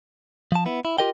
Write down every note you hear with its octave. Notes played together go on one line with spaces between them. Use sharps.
F3 A5
B3 E4
E4
F4 G4 A#4 D#5 G5